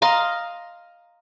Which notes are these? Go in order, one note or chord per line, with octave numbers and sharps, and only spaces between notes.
D#5 F5 A#5 C6